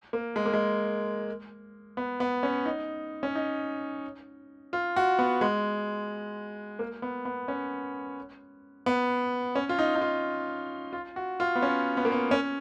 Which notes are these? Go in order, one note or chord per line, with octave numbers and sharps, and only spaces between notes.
A#3
G#3
A#3
G#3
B3
B3
C#4
D#4
C#4
D#4
F4
F#4
B3
G#3
A#3
B3
B3
C#4
B3
C#4
F4
D#4
D#4
F4
F4
F#4
F4
B3
C#4
B3
A#3
B3
C#4